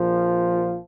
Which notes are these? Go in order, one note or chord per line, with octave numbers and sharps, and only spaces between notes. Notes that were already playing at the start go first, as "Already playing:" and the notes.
Already playing: A#1 A#2 F3